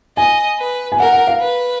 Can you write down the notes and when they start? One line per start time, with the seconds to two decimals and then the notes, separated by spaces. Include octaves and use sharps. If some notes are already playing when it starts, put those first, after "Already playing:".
0.17 D#5 G#5
0.59 B4
0.92 G#5
0.99 A#4 F#5
1.13 F#5
1.27 F5
1.40 B4